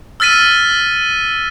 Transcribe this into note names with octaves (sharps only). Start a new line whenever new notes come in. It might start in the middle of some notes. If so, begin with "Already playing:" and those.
E6 F6 A6 B6 D#7